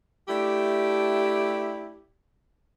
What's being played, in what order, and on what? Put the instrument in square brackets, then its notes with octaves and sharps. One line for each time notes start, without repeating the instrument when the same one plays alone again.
[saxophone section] A3 D4 E4 G4